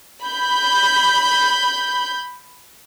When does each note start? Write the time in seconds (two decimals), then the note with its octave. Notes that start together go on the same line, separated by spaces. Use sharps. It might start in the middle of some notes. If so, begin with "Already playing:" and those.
0.23 B5 G6